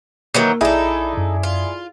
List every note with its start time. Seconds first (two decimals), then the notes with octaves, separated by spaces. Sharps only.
0.34 D#3 E3 F#3 A#3
0.61 A#1 D#4 E4 G#4 A4 D5 E5 B5
1.17 F#2
1.43 F4